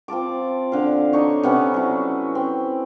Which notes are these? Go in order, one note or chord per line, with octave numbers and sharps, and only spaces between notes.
C4 F4 A5 D6
D3 F5
D4 D#4 C#5
C3 B3 C#4
F#3 E4
C4